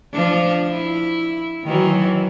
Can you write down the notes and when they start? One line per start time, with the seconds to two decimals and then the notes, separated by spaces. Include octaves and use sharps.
0.13 F3 D4
0.72 E4
1.64 D#3 E3 F#3